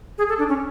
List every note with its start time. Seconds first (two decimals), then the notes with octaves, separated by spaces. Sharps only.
0.18 G#4
0.29 A4
0.39 D4
0.49 C#4